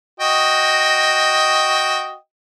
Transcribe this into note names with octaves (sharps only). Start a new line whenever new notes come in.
F#4 D#5 G5